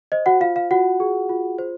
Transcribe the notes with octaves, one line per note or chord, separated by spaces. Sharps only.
C5 D#5
F#4 F#5
F4 F5
F5
F4 F#4 F#5
G#4
F4
C5